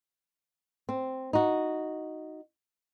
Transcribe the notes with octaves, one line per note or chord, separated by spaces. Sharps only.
C4
D#4 F#4